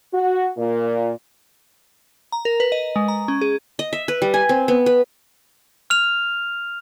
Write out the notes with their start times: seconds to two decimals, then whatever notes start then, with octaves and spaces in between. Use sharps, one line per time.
0.13 F#4
0.57 A#2
2.32 A#5
2.45 A#4
2.60 B4
2.72 D#5
2.96 G#3
3.08 A#5
3.28 C#4
3.41 G#4
3.79 D#5
3.93 E5
4.08 B4
4.22 G3
4.34 G#5
4.49 C4
4.68 B3
4.86 B4
5.90 F6 F7